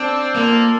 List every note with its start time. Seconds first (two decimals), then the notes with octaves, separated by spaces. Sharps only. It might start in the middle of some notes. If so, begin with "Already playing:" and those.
Already playing: C4 D4 A4 D5
0.35 A#3 F4 A4 D5 F5